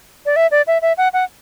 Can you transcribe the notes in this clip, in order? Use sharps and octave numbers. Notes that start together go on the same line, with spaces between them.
D5
E5
D5
E5
E5
F#5
F#5